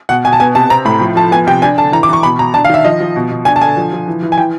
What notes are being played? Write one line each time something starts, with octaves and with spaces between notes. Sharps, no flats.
B2 F#5
B2 G#5
A5
B3 G#5
C3 A5
C4 A#5
A2 B5
F3
F3 A5
B3 G#5
C3 G5
D4 G#5
D3 A5
E3 A#5
D6
E3 C#6
B2 B5
B2 A#5
D4 A5
F5
D#3 E5
F3 D#5
F3
B2
B2
D4 G#5
A5
D3 G#5
F3
F3
E3
E3
G#5
E3 G5